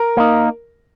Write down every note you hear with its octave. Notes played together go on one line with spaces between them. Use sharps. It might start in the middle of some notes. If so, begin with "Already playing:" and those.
Already playing: A#4
A#3 D#4